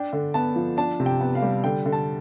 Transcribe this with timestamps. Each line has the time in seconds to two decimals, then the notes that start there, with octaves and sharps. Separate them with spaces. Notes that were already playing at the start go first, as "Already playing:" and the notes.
Already playing: D4 G5
0.13 D3
0.34 B3 A5
0.56 F3
0.77 D4 A5
1.00 C3
1.06 G5
1.21 B3
1.35 F5
1.43 G3
1.64 D3 G5
1.86 D3
1.92 A5